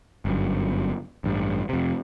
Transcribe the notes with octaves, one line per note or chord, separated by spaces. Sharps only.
G1 F#2
A1 G2
F2 C3